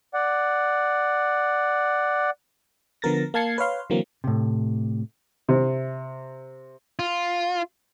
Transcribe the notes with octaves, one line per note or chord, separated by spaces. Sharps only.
D5 F#5
D3 F3 B3 A#4 A6 A#6
A#3 F5 A5 G#6 C7 C#7
B4 C#5 F5 C6
D3 E3 F#3 A#3 C4
A2 C3
C3
F4